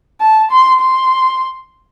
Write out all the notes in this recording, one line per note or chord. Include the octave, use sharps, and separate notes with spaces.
A5
C6
C6